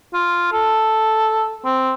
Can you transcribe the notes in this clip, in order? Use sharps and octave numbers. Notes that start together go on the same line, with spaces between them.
F4
A4
C4